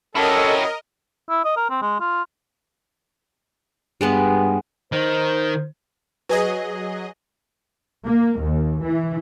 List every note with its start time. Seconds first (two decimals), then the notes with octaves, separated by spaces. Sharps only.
0.15 F#3 C#4 E4 G4 A4 A#4 D#5
1.29 E4
1.45 D#5
1.57 A#4
1.70 C4
1.82 G#3
2.00 F4
4.01 G2 G3 G#3 B3
4.92 D#3 C5
6.29 F#3 G#4 B4 D#5
8.07 A#3
8.41 D#2
8.85 E3